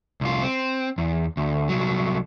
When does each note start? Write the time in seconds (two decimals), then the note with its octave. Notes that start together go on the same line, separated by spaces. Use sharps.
0.21 C2 F4
0.42 C4
0.98 E2
1.37 D2
1.69 C2 F#3